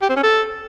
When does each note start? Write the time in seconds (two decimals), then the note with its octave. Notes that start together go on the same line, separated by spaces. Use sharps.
0.02 G4
0.09 C4
0.16 C#4
0.23 A4